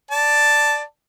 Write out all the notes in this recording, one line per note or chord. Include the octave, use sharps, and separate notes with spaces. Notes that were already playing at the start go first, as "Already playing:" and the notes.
D5 A5